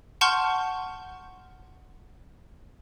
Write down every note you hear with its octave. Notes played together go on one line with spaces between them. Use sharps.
F#5 A5 C6 C#6 F6 G6